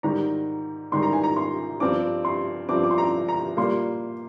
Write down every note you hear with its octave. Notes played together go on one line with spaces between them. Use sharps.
G#2 D#3 G3 A#5
G#2 D#3 G3 C6
A#5
G#5
A#5
C6
G2 F3 C4 D6
C6
G2 F3 C4 D6
D6
C6
A#5
A#5
A#2 G3 A#3 C6